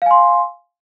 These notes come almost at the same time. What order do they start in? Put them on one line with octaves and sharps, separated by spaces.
F5 G#5 C6